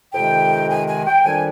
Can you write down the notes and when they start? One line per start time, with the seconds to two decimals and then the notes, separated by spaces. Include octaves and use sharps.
0.15 F2 C3 D#3 G#3 D#4 G5
0.70 G#5
0.89 G#5
1.07 G5
1.25 F2 D#3 G3 D4 G#5